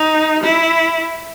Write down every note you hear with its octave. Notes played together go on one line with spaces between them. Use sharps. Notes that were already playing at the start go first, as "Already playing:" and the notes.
Already playing: D#4
E4